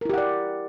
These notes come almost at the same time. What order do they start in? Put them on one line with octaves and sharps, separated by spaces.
A#4 E4 G4 F#5 D5